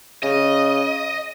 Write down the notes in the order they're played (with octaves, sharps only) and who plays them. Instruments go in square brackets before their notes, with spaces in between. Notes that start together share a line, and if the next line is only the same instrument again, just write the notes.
[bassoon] C#3 [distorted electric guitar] D#5